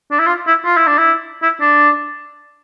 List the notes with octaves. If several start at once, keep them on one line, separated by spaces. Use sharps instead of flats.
D4
E4
F4
E4
F4
E4
D4
E4
E4
D4